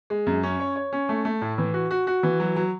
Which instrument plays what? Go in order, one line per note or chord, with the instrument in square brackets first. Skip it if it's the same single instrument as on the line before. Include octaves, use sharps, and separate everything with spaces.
[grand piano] G#3
F#2
C#4
C#5
C#5
C#4
A3
A3
A2
E3
F#4
F#4
F#4
E3
F#3
F#3